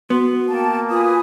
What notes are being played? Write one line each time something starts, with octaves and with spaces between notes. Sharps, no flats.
B3 F#4 C6
A#3 G5 A5
F4 B4 G#5 D#6